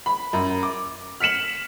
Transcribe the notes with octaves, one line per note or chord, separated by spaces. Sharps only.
B5
F#2
D6
F6 B6 C#7 E7 F#7